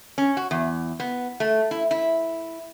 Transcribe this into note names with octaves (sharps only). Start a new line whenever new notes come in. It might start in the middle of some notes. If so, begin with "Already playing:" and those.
C#4
F#4
E2
B3
A3
E4
E4